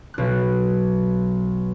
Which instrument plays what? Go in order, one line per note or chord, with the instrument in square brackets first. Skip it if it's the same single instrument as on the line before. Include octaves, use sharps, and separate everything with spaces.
[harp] B1 F#6